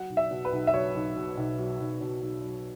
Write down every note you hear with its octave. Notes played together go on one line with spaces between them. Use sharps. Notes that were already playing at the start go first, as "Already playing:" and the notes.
Already playing: F#3 F#5
B1
E5
B2
B4
B1
E5
F#3 C#5
B1
B2
B1
F#3
B1
B2
B1
F#3